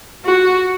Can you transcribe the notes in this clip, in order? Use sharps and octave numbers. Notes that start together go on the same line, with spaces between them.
F#4